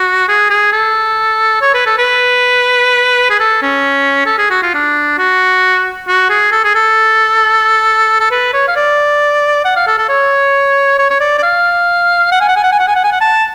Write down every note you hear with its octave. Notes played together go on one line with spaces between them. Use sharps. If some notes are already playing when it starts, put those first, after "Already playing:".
Already playing: F#4
G#4
G#4
A4
C#5
B4
A4
B4
G#4
A4
C#4
A4
G#4
F#4
F4
D4
F#4
F#4
G#4
A4
G#4
A4
A4
B4
C#5
F5
D5
F#5
F5
A4
A4
C#5
C#5
C#5
D5
D5
F5
F#5
G#5
F#5
G#5
F#5
G#5
F#5
G#5
F#5
G#5
F#5
A5